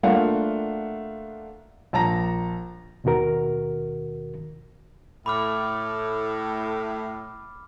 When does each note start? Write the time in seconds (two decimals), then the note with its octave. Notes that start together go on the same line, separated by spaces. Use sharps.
0.03 A3 A#3 D4 F4 F5 F#5
1.93 A#1 A5 A#5 A#6
3.04 D#2 B2 D#3 F#4 A#4
5.26 A2 B5 D6 F6